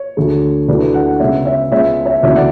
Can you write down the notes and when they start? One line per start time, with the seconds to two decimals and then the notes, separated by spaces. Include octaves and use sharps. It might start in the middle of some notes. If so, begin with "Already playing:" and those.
Already playing: C#5
0.17 D2 D3 A3
0.68 D2 D3 A3 E4 B4 D5
0.94 D5 F#5
1.20 C#3 G#3 B3 C#5 E5
1.46 C#5 E5
1.72 C#2 C#3 G#3 B3 C#5 E5
2.06 C#5 E5
2.23 D2 C#3 E3 B3 C#5 E5
2.36 D5 F#5